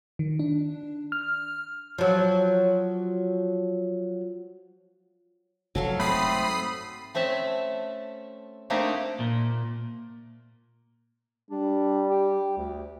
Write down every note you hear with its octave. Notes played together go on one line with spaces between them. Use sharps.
D#3
D4
F6
F3 F#3
F1 F#3 A4 F5
G#2 A3 C4 B5 D#6 C7
A3 C4 C#4 E5 A5
A3 A#3 C4 D4 D#4 G4
A#2
G3 D4
G4
D2